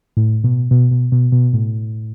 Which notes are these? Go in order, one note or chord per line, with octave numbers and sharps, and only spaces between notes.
A2
B2
B2
B2
B2
B2
A2